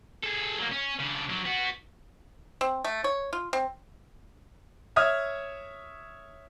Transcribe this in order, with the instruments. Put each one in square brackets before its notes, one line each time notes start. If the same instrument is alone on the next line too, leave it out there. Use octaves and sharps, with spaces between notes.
[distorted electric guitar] G#4 A4
F#3 A#3
C#4
C#3 D4
F#3 D4
B3 F#4
[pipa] C4
A3
C#5
F4
C4
[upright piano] C#5 E5 D#6 F6 G#6